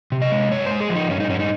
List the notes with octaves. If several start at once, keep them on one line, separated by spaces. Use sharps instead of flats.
C3
D#5
G#3
G2 C#5
C5
G#3
G#4
F3
D#4
G2 C#4
D#4
G2 C#4
D#4